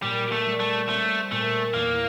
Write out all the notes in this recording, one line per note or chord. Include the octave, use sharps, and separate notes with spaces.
A#2 G3
A3
G3
A3
A3 C4
A#2 A3
E2 A#3